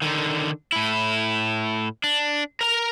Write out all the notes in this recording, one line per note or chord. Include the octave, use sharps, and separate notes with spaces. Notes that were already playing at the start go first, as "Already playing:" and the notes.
D3 D#3
A2 E4
D4
A#4 A#5